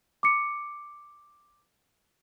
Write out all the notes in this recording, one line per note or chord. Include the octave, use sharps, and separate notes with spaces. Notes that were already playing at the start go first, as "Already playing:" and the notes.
D6 C#7